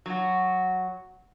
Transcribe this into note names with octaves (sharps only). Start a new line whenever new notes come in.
F#3 F#4